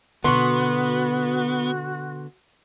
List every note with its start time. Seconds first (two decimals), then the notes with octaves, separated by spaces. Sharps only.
0.24 B2 D3 B3 F#4 C6 C#6